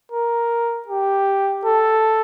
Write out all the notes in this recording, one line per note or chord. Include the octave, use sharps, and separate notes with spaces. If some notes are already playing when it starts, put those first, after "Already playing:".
A#4
G4
A4